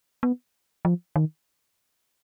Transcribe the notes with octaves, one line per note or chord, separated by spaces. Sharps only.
B3
F3
D#3